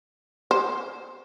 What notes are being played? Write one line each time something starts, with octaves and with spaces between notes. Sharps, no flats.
C5